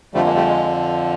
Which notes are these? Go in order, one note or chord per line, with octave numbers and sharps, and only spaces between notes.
F2 D3 F3 G3 A3
G#3 A#3
G3 A3
G#3